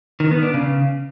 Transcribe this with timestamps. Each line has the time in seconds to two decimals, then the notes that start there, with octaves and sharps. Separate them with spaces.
0.20 D#3
0.31 B3
0.43 D4
0.54 C#3